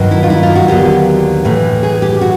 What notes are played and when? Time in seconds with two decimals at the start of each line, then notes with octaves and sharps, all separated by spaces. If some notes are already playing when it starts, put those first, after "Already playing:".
Already playing: G2 D#3 F#3
0.11 E4
0.23 F4
0.30 E4
0.43 F4
0.55 F#4
0.68 D#2 D3 F#3 B3 G4
1.44 A2 E3 A3
1.83 G#4
2.02 G4
2.21 F#4